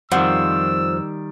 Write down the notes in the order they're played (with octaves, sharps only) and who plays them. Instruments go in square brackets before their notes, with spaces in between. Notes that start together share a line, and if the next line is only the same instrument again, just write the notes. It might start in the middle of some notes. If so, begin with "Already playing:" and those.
[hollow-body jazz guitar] F2 F#5 [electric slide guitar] D#3 G3 [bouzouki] F3 [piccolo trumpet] E6